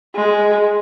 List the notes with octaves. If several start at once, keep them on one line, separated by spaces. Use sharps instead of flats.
G#3